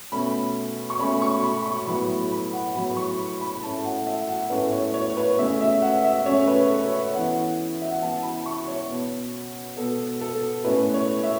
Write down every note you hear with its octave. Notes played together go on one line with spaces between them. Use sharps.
B2 A3 C#4 B5
C#6
B2 A3 C#4 B5
C#6
B5
C#6
A2 F#3 B3 B5
B5
F#5
A2 F#3 B3 B5
C#6
B5
B5
A2 A3 C#4 A5
F#5
E5
F#5
A2 A3 C#4 B4
C#5
C#5
B4
C#3 A3 C#4 E5
E5
F#5
E5
C#3 A3 C#4 C#5
B4
A4
C#5
E3 B3 F#5
E5
F#5
E3 B3 A5
B5
C#6
C#5
B2 B3
B2 B3 A4
A4
A2 A3 C#4 B4
C#5
E5